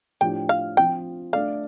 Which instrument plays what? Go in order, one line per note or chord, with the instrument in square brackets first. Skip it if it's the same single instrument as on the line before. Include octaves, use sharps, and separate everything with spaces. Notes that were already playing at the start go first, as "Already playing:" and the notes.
[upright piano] A2 F3 D4 G4 [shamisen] G5
[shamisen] F5
[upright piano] F3 C4 F4 [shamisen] G5
[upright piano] A3 D4 A4 D5 [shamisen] F5